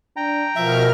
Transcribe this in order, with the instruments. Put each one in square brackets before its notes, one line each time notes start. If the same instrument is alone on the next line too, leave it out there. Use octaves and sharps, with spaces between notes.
[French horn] D4 [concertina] G5 A#5
[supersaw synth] B2 A#4 F6 [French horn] F3 [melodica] E5